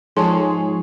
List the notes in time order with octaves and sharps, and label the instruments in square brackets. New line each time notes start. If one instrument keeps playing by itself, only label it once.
[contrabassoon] G#2 [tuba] F3 [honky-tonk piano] G#4 C#5 [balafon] A5 C6